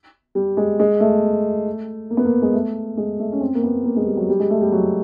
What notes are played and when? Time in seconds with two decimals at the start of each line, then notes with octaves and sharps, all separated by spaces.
0.35 G3
0.57 G#3
0.80 G#3
1.00 A3
2.10 A#3
2.17 B3
2.25 A#3
2.42 G#3
2.53 A3
2.97 G#3
3.19 A3
3.32 C#4
3.41 C4
3.55 A#3
3.63 B3
3.85 A#3
3.96 G#3
4.06 G3
4.17 F#3
4.29 G3
4.40 G#3
4.50 A3
4.62 G3
4.72 F#3